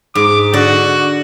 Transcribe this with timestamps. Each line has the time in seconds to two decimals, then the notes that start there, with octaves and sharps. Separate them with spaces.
0.15 G#2 D6
0.53 D3 F#4 D5